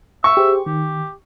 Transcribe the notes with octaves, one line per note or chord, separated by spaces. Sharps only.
E5 C#6
G4 G#4 C5
D#3 G4